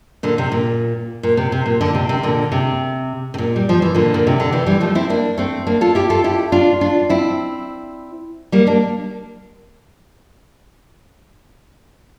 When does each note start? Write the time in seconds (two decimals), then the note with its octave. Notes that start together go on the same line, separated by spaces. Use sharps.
0.23 A#2 D3
0.38 C3
0.52 A#2
1.23 A#2
1.37 C3
1.52 C3
1.66 A#2
1.81 A#2 D3
1.95 C3
2.09 C3
2.23 A#2 D3
2.52 C3
3.34 C3
3.38 A#2
3.56 G3
3.69 F3
3.82 E3
3.95 A#2 D3
4.14 A#2
4.27 C3
4.40 D3
4.52 C3 E3
4.66 E3 G3
4.81 F3 A3
4.95 C4 E4
5.10 A#3 D4
5.38 A3 C4
5.67 A#3 D4
5.81 F4 A4
5.95 E4 G4
6.10 F4 A4
6.24 E4 G4
6.52 D4 F4
6.81 D4 F4
7.10 C4 E4
8.52 G3 A#3
8.67 A#3 D4